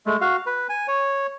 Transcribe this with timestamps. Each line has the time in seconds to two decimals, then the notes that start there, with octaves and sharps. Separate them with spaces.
0.06 G#3 A3
0.21 F#4 F5
0.46 B4
0.69 G#5
0.88 C#5